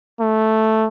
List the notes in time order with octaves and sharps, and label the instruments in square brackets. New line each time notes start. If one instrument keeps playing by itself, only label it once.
[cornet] A3